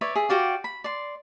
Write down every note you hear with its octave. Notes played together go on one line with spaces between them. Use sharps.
B4 C#5 D5 E5
G#4 E5
F#4 G4 D5 F5
B5
D5 C6